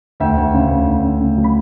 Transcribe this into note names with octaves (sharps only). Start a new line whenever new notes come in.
D2 E5 G5
D2
C#3
D2
D2
C#3
C#3
F#3
B5